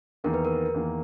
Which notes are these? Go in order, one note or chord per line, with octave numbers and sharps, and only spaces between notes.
E2 D#3 A#3 A#4
B4
A#4
E2 D#3 A#3